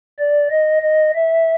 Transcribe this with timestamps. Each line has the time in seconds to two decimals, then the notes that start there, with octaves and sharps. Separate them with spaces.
0.19 D5
0.50 D#5
0.82 D#5
1.14 E5